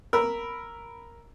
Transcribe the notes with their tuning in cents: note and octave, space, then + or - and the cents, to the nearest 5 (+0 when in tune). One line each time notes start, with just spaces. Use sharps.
A#4 +0 B5 +0 E6 +0